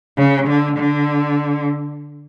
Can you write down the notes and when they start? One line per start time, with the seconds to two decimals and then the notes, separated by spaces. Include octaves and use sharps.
0.17 C#3
0.47 D3
0.77 D3